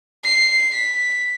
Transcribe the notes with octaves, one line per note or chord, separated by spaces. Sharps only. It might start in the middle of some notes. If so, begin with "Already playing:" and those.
C7
B6